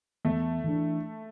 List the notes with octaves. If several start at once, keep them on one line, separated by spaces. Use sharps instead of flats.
E2 A3
E3 D4